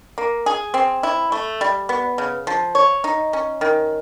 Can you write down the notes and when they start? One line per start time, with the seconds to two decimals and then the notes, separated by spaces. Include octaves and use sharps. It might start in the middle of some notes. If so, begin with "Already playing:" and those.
0.18 A#3
0.46 G#4
0.74 C4
1.03 E4
1.32 A3
1.61 G3
1.89 B3
2.18 C#3
2.47 F3
2.75 C#5
3.04 D#4
3.33 C#4
3.61 D#3